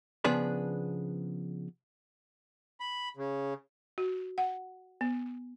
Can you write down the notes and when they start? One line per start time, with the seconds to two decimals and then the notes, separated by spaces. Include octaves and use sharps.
0.24 C#3 F3 B3 D4 G#4 B4
2.80 B5
3.17 C#3
3.98 F#4
4.38 F#5
5.01 B3